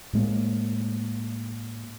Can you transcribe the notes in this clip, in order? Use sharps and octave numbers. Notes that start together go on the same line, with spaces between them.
A2 G#3 A#3